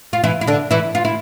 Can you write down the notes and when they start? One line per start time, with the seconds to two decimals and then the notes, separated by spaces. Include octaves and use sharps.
0.13 F4
0.24 E3 E4
0.41 E4
0.47 D3 D4
0.71 E3 E4
0.95 F4
1.05 E4